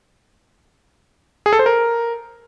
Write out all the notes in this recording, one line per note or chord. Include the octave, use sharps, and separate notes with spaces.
G#4
A4
C5
A#4